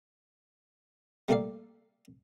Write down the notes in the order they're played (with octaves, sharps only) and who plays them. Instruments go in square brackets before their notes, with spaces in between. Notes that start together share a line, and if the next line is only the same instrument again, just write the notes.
[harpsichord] G3 A3 A#3 A4 D5 F5